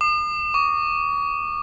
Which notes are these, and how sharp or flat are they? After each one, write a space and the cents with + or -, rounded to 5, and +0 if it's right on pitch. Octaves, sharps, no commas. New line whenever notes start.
D#6 -45
C#6 +40